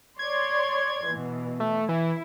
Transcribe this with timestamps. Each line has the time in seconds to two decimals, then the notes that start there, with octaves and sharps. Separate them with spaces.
0.19 C#5 D5 C6 G#6
1.07 B2 E3
1.60 A3
1.89 E3 E4